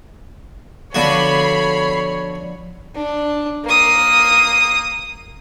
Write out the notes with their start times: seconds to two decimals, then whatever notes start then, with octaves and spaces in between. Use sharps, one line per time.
0.95 D3 F3 B3 D4 F#4 C#5 B5 C7
2.95 D4
3.65 A#3 D#6